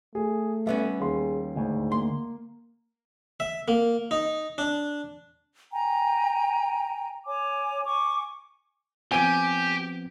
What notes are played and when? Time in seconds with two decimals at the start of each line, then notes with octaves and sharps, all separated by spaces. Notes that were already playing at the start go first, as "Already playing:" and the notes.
0.15 A3 G#4
0.67 G3 B3 C#4 E5
1.00 D#2 G#4 C6
1.56 D2 G#2
1.92 A#3 C6
3.40 E5
3.68 A#3
4.11 D#4
4.58 D4
5.72 G5 G#5 A#5
7.25 C#5 G#5 D6
7.85 G#5 C#6 D6
9.12 F3 B3 C4 G4 G5 G#5 D7 D#7